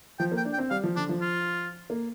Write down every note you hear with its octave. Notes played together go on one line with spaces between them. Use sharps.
F3 G5
A#3
G5
D4
G5
C4
G3 F5
F3
D3 D4
F3
F4
A#3